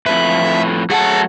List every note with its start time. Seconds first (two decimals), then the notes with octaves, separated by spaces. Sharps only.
0.06 F2 A2 B4 E5
0.90 F#3 A3 G#4 F#5 A5